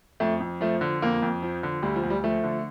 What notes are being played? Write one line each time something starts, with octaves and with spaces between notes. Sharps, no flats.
F2 A3
F2
F3 A3
D3
F2 A#3
F2
F3
D3
D2 G3
F3
D2
G3
F3 A3
D3